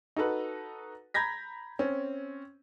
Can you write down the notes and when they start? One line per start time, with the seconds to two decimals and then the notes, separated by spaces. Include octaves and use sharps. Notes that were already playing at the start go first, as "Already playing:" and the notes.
0.16 D#4 F#4 A4 B4
1.14 A#5 B5 G6 G#6 A#6 B6
1.79 C4 C#4